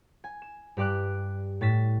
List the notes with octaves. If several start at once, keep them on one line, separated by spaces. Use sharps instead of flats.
G#5
E7
G2 G4 D5 D6 F#6
A2 A6 B6 E7